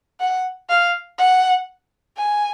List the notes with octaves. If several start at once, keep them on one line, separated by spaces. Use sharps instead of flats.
F#5
F5
F#5
G#5